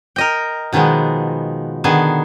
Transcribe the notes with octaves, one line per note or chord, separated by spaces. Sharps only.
A#4 D#5 G5
B2 D#3 F3 G#3 B3
D3 D#3 B3 G#4 G#5 A5